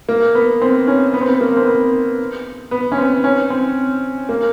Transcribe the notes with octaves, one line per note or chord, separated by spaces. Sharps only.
A#3
B3
C4
C#4
B3
C4
B3
A#3
C4
B3
B3
C#4
C4
C#4
C4
A#3